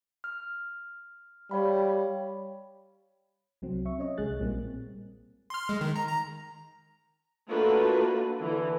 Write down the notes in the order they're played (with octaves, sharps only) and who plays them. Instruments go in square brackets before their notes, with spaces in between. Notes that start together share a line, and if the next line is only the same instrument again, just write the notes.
[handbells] F6
[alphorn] G3 [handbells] C#5 F5 B5
[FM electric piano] C2 F#3 C4
E5 C#6
C#4 C#5 D#5
C2 G#3 G#4 F#6 A6
A#1 A#2 G3 A#3 C4
[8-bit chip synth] C6 F6
G#3
D#3
A#5
A#5
[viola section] A3 A#3 D4 F4 F#4 B4
D3 E3